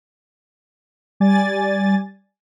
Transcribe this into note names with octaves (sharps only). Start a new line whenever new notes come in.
G3 D5 G#5 A6